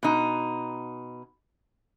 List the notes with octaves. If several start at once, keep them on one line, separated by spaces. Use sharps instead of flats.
B2 D#4